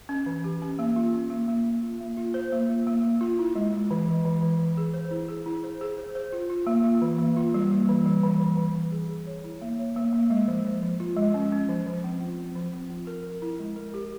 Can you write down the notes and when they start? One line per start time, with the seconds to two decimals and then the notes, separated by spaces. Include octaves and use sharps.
0.09 C#4
0.26 E3
0.44 G4
0.62 C#4
0.79 A#3
0.96 F4
1.14 C#4
1.30 A#3
1.48 A#3
1.66 A#3
1.83 F4
2.01 A#3
2.17 F4
2.34 C5
2.52 A#3
2.69 F4
2.87 A#3
3.04 A#3
3.21 F4
3.39 E4
3.55 G#3
3.73 G#3
3.91 E3
4.08 G#3
4.25 E3
4.43 E3
4.59 E3
4.77 G#4
4.94 C5
5.11 E4
5.28 G#4
5.46 E4
5.64 C5
5.81 G#4
5.98 C5
6.15 C5
6.33 F4
6.50 F4
6.67 A#3
6.84 F4
7.02 E3
7.19 A#3
7.37 F4
7.54 G3
7.71 A#3
7.89 E3
8.06 G3
8.23 E3
8.40 E3
8.57 E3
8.75 E3
8.92 G#4
9.09 G#4
9.27 C#5
9.44 E4
9.62 A#3
9.79 C#5
9.96 A#3
10.13 A#3
10.30 G#3
10.48 F3
10.65 F3
10.83 F3
11.00 F4
11.17 G#3
11.34 C#4
11.52 C#4
11.69 F3
11.87 F3
12.04 C4
12.20 F4
12.39 C4
12.56 F3
12.73 C4
12.90 F4
13.07 A#4
13.25 A#4
13.42 E4
13.59 G#3
13.76 A#4
13.94 G4